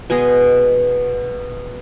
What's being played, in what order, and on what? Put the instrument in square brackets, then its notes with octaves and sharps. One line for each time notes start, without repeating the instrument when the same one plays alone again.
[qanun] B2 G#3 G#4 D#5